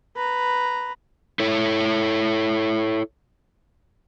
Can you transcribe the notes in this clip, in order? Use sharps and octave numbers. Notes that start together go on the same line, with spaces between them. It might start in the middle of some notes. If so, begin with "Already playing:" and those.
B4 A#5
E4 A4 C#5